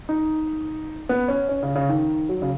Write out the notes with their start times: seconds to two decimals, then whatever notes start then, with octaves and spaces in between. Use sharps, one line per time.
0.09 D#4
1.09 B3
1.28 C#4
1.49 C#4
1.63 C#3
1.75 C#3
1.89 D#3
2.29 F#3
2.42 C#3